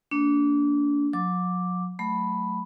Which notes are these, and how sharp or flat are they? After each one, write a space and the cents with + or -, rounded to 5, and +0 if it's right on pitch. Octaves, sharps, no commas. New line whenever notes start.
A#3 -35 D4 -25
F#3 -40 D6 +0
F#3 +0 A3 +0 B5 +0